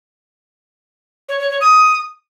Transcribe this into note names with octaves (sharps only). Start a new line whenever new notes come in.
C#5
C#5
C#5
D#6